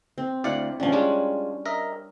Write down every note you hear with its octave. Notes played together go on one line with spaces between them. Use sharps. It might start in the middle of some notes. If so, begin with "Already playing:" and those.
C4
D2 E4 D5 F5 F#5
A1 F3 C#4 D4
G3 G#3 D4 F4 B5
A#4 D#5 E5